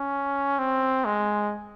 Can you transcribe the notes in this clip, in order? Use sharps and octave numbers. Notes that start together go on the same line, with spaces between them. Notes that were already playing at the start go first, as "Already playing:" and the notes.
Already playing: C#4
C4
G#3